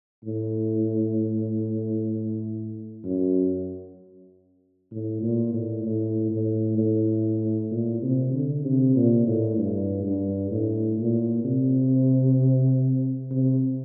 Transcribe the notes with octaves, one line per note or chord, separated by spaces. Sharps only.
A2
F#2
A2
A#2
A2
A2
A2
A2
A#2
C3
D3
C3
A#2
A2
G2
G2
A2
A#2
C3
C3